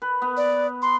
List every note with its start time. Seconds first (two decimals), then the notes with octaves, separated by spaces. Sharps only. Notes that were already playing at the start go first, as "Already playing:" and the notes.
0.02 B4
0.22 B3 B4
0.37 D5
0.82 C6